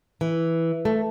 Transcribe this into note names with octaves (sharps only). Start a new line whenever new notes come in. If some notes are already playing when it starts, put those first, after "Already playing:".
E3
A3